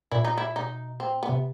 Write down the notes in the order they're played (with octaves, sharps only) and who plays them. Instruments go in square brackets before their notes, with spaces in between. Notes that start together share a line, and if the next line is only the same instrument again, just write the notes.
[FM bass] A#2 [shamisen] E4
[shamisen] D#4
E4
[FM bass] B2 [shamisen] D#4
[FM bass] A#2 [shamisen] C4
[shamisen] B3
[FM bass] C3